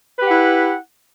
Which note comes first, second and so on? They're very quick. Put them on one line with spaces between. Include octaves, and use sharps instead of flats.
B4 G4 F#5 E4